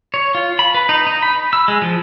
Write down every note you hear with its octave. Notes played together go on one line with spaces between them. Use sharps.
C#5
F4
B5
B4
D#4
D#4
B5
E6
G#3
F3